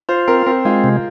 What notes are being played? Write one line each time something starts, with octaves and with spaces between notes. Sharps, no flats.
F4 C5
C4 A#4
C4 A#4
G#3 F4
C3